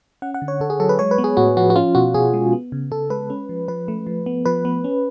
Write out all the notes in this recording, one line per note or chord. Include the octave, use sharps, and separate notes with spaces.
C#4 F#5
F#5
D3
C#5
D3 A4
G#4
F#3 A4
B4
G#3 C#5
B4
B3
G#4
A2 F#4
F3 F#4
F#4
C#4 F4
B2 F#4
B2 G#4
G#3
B3
C#3
C#3 A4
G#3 B4
C#4
F3
F3 B4
A3
F3
B3
F3 B4
B3
C#4